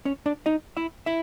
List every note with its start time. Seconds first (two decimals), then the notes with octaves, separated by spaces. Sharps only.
0.05 C#4 C#5
0.26 D4 D5
0.46 D#4 D#5
0.77 E4 E5
1.06 E4 E5